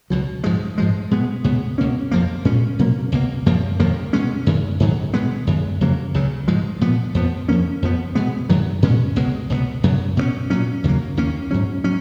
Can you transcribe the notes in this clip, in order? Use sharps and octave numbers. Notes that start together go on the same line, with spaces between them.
C#2 B2 F#3
G#2 F3 G#3
G#2 F3 G#3
B2 G#3 B3
C#2 B2 G#3 B3
C#2 B2 A#3 C#4
F2 F3 A#3
A#2 G#3 C#4
B2 F#3 A#3 C#4
C#2 B2 A#3
F#2 F3 A#3
F2 D#3 A#3
B2 G#3 C#4
F#2 D#3 G#3
G#2 D#3 F#3
B2 G#3 B3
F#2 D#3 G#3
F2 C#3 F#3 A#3
C#2 C#3 F#3
G#2 F3 G#3
A#2 F3 B3
F2 F3 B3
F2 F3 A#3 C#4
F2 F3 B3
B2 G#3 B3
F#2 D#3 F#3
A#2 G#3 C#4
C#2 B2 G#3
C#2 B2 F#3 B3
F#2 C#3 F#3
B2 A#3 C#4
A#2 F#3 C#4
D#2 C#3 F#3 A#3
D#2 D#3 A#3 C#4
G#2 F#3 C#4
F#3 C#4